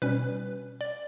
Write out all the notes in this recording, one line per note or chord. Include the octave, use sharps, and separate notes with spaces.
B2 G3 C#4 B4
D5